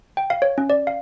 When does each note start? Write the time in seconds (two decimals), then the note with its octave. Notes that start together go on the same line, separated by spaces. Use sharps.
0.17 G5
0.30 F5
0.42 C#5
0.58 C#4
0.70 D5
0.87 F5